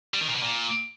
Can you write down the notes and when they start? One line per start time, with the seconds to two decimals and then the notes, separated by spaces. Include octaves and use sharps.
0.14 G3
0.21 D#3
0.28 A#2
0.35 B2
0.42 A#2